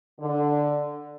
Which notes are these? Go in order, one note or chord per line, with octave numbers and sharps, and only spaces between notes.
D3